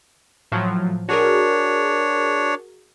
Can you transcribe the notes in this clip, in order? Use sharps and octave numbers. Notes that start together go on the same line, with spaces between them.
A2 F3 F#3
D4 F#4 G#4 A#4 C#5